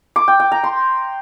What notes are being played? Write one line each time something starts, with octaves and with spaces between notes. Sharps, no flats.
D6
G5
G5
A#5
C6